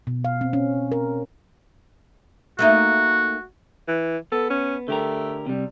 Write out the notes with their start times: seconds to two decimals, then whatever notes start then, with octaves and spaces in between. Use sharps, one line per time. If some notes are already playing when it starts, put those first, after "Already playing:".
0.07 B2
0.25 F5
0.41 C4
0.53 C#4
0.92 A#4
2.59 A3 A#3 D#4 F#4
3.88 E3
4.32 B3 A4
4.50 C#4
4.88 D3 A3 G4 A#4
5.47 C3 G3